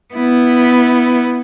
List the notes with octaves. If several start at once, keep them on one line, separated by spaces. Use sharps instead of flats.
B3 E4